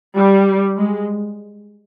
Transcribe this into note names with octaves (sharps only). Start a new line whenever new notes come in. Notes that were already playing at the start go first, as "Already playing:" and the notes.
G3
G#3